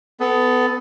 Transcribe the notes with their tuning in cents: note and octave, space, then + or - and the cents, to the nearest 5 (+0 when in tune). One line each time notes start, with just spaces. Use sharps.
B3 +20 A4 -10